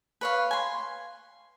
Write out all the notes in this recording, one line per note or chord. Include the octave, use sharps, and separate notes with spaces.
B4 C#5 F5
G#5 C6